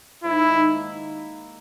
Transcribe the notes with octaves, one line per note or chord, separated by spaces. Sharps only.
G#2 E4
D#3
A#3